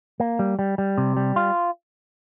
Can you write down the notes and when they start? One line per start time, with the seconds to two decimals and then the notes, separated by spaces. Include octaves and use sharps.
0.20 A#3
0.39 G3
0.59 G3
0.78 G3
0.98 C3
1.17 G3
1.36 F4